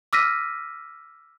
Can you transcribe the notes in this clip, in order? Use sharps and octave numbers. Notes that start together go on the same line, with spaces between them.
D6 E6 F6 A#6 B6 D#7